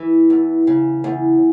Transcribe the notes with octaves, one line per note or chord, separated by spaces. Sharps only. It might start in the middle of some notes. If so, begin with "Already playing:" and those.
Already playing: E3
E2
C#3
E2